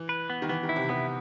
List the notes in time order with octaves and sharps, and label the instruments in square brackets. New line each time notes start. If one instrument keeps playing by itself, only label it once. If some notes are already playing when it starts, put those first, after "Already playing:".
Already playing: [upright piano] E3
[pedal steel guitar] B4
B3
[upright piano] D#3
[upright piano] E3 [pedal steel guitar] B3
[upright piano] D#3
[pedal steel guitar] E4
[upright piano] C3
[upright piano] C3 [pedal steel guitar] B3